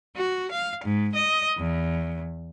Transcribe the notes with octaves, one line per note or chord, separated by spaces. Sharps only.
F#4
F5
G#2
D#5
E2